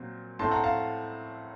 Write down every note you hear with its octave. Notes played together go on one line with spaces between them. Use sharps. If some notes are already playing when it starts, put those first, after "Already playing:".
Already playing: A#2 F#3 C4
A2 A3 C4 A5 C6
F#5 A#5
F5 A5